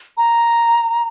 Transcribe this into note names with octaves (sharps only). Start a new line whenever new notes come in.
A#5